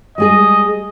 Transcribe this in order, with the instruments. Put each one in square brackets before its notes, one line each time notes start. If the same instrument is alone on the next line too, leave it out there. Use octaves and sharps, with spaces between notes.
[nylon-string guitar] G3 G#3 G#4 [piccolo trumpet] D#5